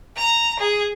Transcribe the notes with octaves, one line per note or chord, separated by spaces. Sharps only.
A#5
G#4